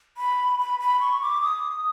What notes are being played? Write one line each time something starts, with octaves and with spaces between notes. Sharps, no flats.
B5
B5
B5
C#6
D6
D#6